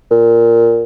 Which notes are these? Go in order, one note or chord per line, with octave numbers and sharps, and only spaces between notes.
A#2